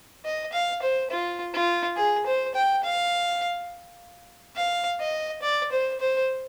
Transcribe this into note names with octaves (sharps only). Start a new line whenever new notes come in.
D#5
F5
C5
F4
F4
G#4
C5
G5
F5
F5
D#5
D5
C5
C5